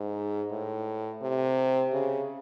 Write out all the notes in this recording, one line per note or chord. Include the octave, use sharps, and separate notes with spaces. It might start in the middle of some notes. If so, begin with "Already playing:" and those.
Already playing: G#2
A2
C3
C#3